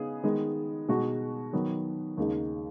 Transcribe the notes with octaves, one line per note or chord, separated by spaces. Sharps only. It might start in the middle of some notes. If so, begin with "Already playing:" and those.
Already playing: C#3 B3 D#4 G#4
D#3 G#3 B3
B2 G#3 D#4 F#4
D#3 F#3 B3
D#2 C#3 G#3 D#4